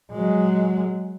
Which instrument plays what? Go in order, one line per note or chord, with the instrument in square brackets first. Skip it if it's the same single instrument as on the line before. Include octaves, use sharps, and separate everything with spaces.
[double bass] F#3 G#3